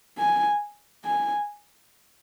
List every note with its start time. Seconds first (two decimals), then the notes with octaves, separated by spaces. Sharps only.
0.19 G#5
1.05 G#5